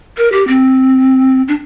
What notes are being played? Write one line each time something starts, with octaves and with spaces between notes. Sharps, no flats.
A#4
G4
C4
D4